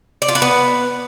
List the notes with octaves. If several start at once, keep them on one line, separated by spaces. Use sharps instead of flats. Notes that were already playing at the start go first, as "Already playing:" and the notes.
D5
F4
B4
B3